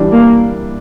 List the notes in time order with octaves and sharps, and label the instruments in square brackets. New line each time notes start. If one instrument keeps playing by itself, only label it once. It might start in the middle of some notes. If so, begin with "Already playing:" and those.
Already playing: [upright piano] E3 G3 D4
[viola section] A#3